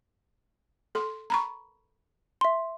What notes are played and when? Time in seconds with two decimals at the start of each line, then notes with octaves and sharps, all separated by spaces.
0.95 A4 C6
1.30 A#5 B5 C#6
2.41 E5 C6